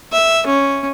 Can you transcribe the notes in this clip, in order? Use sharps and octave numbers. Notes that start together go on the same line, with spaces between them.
E5
C#4